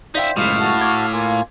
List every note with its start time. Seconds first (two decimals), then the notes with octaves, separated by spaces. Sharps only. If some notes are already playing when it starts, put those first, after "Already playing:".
0.15 D#4 C5 D5 E5 F5 G5 B6
0.37 F#1 C#2 A2 F5
0.60 F#4 A5
0.81 D6 G#6
1.13 A#3 F4 G#5